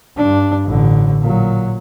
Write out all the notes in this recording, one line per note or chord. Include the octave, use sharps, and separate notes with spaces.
G2 D4
A1 D3
A#2 F#3